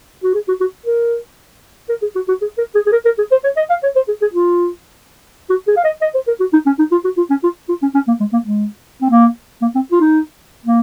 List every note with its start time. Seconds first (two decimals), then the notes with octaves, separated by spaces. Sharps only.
0.24 F#4
0.35 G#4
0.48 F#4
0.60 F#4
0.86 A#4
1.89 A#4
2.02 G#4
2.15 F#4
2.28 F#4
2.41 G#4
2.58 A#4
2.75 G#4
2.87 G#4
2.92 A#4
3.05 A#4
3.18 G#4
3.31 C5
3.44 C#5
3.57 D#5
3.70 F5
3.83 C#5
3.96 C5
4.08 G#4
4.22 G#4
4.34 F4
5.50 F#4
5.67 G#4
5.77 F5
5.84 D#5
6.02 D#5
6.14 C5
6.27 A#4
6.40 F#4
6.53 D#4
6.66 C#4
6.79 D#4
6.91 F4
7.04 F#4
7.17 F4
7.30 C#4
7.43 F4
7.69 F4
7.82 C#4
7.95 C#4
8.08 A#3
8.20 G#3
8.33 A#3
8.46 G#3
9.02 C4
9.10 A#3
9.62 A#3
9.75 C4
9.91 F4
10.01 D#4
10.65 A#3